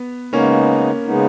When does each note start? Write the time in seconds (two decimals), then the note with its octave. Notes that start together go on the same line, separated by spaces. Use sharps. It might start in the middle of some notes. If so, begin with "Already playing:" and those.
Already playing: B3
0.33 C#3 G#3 A#3 B3 C#4 D#4
1.06 C#3 G#3 B3 D#4